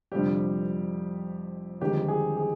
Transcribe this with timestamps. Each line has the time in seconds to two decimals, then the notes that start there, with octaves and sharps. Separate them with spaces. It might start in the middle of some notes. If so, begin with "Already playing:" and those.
0.12 F1 F2 D3 G3 G4
1.81 G1 F2 D#3 G#3 G4
2.08 G#4
2.37 G#4